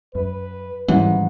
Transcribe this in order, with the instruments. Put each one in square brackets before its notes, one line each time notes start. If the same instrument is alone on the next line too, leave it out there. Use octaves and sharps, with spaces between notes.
[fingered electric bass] F#2 [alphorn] B4
[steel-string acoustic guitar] G#2 [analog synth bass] E3 [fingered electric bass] F#3 G3 C#4